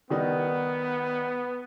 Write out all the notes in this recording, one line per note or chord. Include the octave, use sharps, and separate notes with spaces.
D#3 G3 B3 D#4